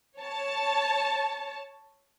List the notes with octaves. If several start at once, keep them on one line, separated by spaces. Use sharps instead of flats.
C#5 A5